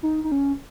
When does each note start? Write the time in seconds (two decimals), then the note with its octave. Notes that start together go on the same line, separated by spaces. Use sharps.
0.03 D#4
0.24 D#4
0.32 C#4